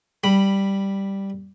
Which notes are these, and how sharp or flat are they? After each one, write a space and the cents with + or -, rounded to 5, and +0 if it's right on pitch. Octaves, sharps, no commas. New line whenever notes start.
G3 +0 B5 +0